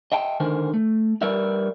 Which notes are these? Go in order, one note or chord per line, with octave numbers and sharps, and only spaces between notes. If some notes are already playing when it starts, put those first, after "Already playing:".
D#5 E5 G5 A5
D3 D#3 A#4 C5
A3
G3 A#4 B4 D5 E5